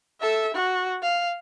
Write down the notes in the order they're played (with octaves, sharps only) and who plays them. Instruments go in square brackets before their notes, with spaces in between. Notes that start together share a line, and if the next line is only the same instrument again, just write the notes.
[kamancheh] A4 E5
F#4
F5